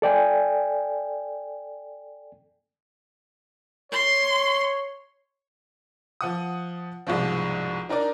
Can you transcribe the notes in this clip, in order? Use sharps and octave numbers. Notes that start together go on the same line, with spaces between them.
A4 D5 G5 G#5
C#5 C6
F3 F#5 D#6
C2 G#2 B2 F3
D4 D#4 A#4 D5